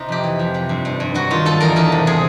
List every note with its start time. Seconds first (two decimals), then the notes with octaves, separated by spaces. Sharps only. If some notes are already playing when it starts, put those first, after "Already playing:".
Already playing: C3 D#4
0.09 F2 G4
0.24 E3
0.39 F2
0.54 C3
0.69 G2
0.85 G2
1.00 G2
1.14 F#3 F#4
1.30 D#3 F4
1.45 G2 A4
1.60 E2 A#4
1.76 E2 A4
1.92 C3
2.07 C3 G#4